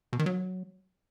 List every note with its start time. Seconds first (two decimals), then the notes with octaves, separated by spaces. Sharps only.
0.13 B2
0.19 D#3
0.26 F#3